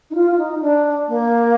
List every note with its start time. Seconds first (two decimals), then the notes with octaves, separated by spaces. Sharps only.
0.11 D#4
0.15 F4
0.31 F4
0.39 D#4
0.62 D4
1.08 A#3